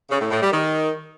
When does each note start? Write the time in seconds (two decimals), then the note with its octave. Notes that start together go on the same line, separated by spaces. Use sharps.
0.10 C#3
0.21 A2
0.31 A2
0.42 G3
0.52 D#3